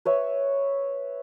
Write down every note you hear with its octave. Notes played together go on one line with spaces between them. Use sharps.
B4 C#5 E5